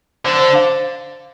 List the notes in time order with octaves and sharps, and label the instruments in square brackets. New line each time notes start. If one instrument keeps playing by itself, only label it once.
[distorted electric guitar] D3 [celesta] C5
[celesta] C5
F5